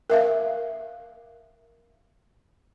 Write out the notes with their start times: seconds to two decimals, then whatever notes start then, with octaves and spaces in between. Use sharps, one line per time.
0.10 A#4 E5 F5